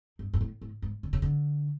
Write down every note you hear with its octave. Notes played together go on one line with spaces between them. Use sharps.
G2
G#2
A2
A2
G#2
D3
C#3
D3